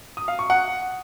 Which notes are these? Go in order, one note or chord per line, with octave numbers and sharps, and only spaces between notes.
D#6
F5
C#6
F#5